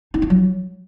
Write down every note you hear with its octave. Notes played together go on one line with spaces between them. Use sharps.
D#4
F4
F#3